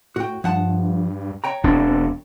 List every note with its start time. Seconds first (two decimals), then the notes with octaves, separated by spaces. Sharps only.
0.16 A2 F#4 G5
0.44 G2 F3 F#5 A5
1.44 C#5 G5 A#5
1.64 E1 E2 C4 D4